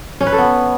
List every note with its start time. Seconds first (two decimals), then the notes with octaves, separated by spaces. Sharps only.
0.21 C#4
0.27 B4
0.32 A4
0.38 B3